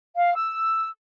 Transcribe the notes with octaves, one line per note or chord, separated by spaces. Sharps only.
F5
E6